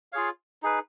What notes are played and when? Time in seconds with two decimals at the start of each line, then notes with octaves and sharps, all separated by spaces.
0.12 F4 G#4 C#5 F5
0.62 D#4 G#4 B4